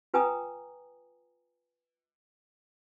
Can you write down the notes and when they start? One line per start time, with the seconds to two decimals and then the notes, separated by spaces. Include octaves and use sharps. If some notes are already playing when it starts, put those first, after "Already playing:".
0.14 F4 B4 G5 G#5 A#5 D#6